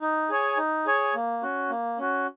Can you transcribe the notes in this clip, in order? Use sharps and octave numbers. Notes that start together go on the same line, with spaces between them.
D#4
G#4 C#5 G#5
D#4
G#4 C#5 G#5
A#3
C#4 F#4
A#3
C#4 F#4